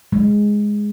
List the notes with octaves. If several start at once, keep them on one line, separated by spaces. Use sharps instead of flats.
G#3